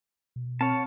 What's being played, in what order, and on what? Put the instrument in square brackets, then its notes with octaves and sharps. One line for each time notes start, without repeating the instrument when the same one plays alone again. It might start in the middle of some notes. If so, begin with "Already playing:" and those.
[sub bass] B2
[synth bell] C4 [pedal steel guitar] C#5 A5